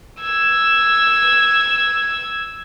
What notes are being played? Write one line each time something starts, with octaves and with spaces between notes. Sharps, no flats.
E6 G#6